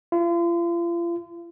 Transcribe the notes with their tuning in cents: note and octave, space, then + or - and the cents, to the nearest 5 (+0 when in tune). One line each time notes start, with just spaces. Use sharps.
F4 -40